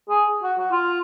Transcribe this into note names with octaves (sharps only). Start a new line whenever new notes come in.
G#4
F#4
F#4
F4